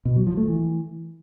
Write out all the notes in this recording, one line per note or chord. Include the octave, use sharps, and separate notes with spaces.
B2
F#3
F3
A3
E3